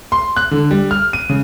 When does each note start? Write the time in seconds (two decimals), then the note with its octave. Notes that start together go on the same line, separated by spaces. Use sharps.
0.12 C6
0.36 F#6
0.51 D3
0.71 G3
0.91 F6
1.13 D#7
1.29 C#3